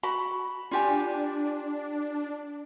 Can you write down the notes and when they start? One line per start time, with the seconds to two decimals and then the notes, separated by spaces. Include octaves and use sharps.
0.03 F#4 B5
0.71 D4 F4 G4 G#5